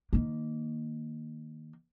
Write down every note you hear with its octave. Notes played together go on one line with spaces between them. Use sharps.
D#3 A#3